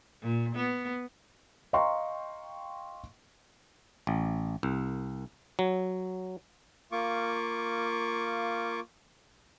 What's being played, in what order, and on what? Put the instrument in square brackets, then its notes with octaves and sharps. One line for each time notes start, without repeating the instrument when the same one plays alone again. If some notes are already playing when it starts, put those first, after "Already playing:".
[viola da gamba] A#2
B3
[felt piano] D#5 F5 G5 A#5 C6 C#6
[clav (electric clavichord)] A1
C2
F#3
[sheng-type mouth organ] A#3 F4 C#6 D6